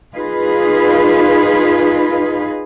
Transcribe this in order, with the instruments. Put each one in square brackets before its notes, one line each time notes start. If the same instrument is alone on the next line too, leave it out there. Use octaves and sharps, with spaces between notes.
[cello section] D#4 F4 G#4 B4